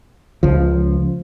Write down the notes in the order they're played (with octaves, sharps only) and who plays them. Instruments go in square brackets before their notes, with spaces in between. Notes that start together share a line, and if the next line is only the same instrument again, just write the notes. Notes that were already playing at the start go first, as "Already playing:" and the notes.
[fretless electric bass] C#2 F3